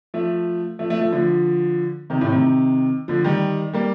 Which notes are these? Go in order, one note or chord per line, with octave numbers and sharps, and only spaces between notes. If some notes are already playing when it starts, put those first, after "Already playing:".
F3 A3
F3 A3
F3 A3
F3 A3
D3 F3
C3 D#3
A2 C3
C3 D#3
D3 F3
D#3 G3
G3 A#3